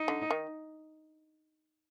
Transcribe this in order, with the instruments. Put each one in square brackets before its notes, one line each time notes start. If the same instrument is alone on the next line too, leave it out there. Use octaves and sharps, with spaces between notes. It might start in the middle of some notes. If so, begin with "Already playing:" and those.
Already playing: [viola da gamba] D#4
[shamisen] D3
D#3